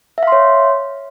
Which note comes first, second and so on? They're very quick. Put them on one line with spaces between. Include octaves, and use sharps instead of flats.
E5 F5 C6 C#5